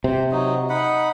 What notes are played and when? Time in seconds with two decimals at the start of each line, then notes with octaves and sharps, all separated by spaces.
0.04 C3 C5
0.31 F#3 D#4
0.70 D#4 F#5 B5